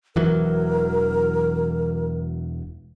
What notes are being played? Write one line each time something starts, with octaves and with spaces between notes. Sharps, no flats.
E1 E3 F#3 A#4